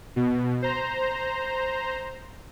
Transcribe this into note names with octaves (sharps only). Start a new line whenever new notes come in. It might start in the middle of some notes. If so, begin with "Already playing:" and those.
B2
C5 A#5